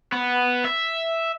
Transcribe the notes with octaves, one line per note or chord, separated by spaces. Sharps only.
B3
E5